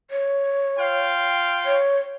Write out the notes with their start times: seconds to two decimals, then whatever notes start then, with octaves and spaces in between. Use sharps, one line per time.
0.11 C#5
0.79 F4 F5 G5
1.65 C#5